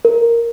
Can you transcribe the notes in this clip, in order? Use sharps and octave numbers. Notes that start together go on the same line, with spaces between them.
A#4